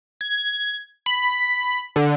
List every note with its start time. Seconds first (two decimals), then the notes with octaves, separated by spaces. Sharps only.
0.21 G#6
1.06 B5
1.96 D3